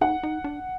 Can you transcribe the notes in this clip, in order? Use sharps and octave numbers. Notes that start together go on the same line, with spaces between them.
D#4 F#5
D#4
D4